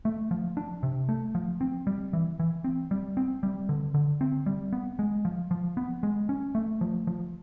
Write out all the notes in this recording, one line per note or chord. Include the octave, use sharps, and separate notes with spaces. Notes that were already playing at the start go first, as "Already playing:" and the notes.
A3
F3
D4
C3
A3
F3
C4
G3
E3
E3
C4
G3
C4
G3
D3
D3
C4
G3
B3
G#3
F3
F3
B3
G#3
C#4
A3
F3
F3